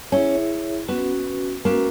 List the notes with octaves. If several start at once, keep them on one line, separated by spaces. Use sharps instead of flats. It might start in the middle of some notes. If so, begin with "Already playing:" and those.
C#4 E4 G#4 C#5 E5
B3 C#4 F#4 B4
G#3 A#3 C#4 F#4 B4